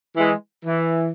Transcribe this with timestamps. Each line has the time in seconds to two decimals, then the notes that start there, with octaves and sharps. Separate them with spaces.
0.17 E3 G#3
0.65 E3